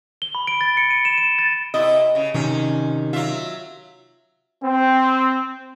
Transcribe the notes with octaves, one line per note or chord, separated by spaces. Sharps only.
G7
B5
D7
A6
C#7
D#7
E7
D#7
A6
C3 E4 D#5
C#3
C3 D#3 C#4
F#3 F4 E5
C4